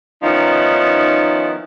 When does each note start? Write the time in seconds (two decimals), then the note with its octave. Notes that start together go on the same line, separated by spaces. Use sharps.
0.23 D#3 F3 B3 C#4 D#4 E4